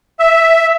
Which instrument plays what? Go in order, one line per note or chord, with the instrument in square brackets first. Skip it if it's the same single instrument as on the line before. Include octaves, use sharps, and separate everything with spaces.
[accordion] E5